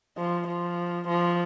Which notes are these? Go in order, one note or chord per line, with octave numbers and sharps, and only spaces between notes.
F3
F3
F3